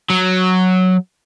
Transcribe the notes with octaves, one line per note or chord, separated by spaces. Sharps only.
F#3